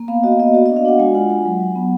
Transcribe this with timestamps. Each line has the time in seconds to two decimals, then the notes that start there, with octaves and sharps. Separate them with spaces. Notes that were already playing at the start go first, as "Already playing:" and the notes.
Already playing: A#3
0.08 B3 F5
0.24 F#4 D#5
0.39 B3 D#5
0.54 F#4 D5
0.66 D#5
0.69 D4
0.76 F5
0.85 D4 F#5
0.99 G#3 G#5
1.15 F4 F#5
1.30 G#3 F#5
1.45 F#3
1.60 F#3
1.75 B3